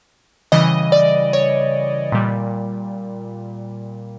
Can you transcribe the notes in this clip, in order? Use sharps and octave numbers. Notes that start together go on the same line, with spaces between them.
C#3 E3 G3 D#5
D5
C#5
A#2 G3